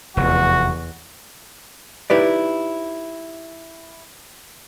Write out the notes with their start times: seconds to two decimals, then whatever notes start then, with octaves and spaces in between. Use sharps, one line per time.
0.17 F1 E2 F#4
2.10 D#4 E4 G4 B4 D5